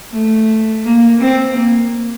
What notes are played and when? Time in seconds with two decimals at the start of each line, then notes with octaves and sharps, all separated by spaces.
0.12 A3
0.85 A#3
1.21 C4
1.57 A#3